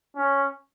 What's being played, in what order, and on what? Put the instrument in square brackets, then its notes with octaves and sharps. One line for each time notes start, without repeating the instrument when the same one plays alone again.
[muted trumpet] C#4